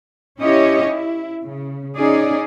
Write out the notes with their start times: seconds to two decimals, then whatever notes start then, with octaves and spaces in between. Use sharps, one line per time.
0.39 C#4 E4 G4 C#5 D#5
0.89 E4
1.43 C#3
1.96 C#4 D#4 G#4 D5